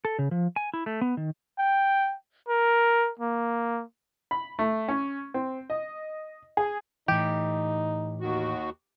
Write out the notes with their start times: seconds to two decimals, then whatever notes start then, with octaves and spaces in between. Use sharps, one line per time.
0.05 A4
0.19 C#3
0.31 F3
0.56 G#5
0.73 E4
0.86 A3
1.01 B3
1.17 D#3
1.59 G5
2.48 A#4
3.19 A#3
4.31 B5
4.59 A3
4.88 C#4
5.34 C4
5.70 D#5
6.57 G#4
7.08 A2 E3 D#4 G4
8.21 D#2 D#3 F#4